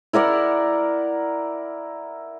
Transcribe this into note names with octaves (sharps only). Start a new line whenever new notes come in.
E4 A#4 D5 F#5